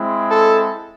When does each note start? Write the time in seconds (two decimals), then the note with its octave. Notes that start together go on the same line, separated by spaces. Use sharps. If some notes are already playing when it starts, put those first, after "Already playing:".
Already playing: G#3 C4 E4
0.31 A4